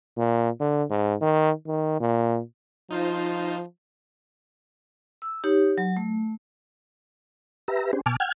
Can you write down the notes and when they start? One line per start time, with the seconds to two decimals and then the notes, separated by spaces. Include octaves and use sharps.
0.17 A#2
0.60 D3
0.90 G#2
1.21 D#3
1.67 D#3
2.00 A#2
2.91 F3 D#4 F4 C5
5.22 E6
5.44 D#4 G4 C#5
5.78 F#3
5.97 A3
7.68 G4 B4 E5 A#5
7.93 C#4 D4 G4 G#4 C5
8.06 B2 G#5 A5 D6 F6
8.20 F#5 G5 F6 G#6